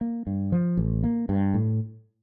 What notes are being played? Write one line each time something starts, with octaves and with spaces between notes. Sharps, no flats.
A#3
G2
F3
A1
A#3
G2
A2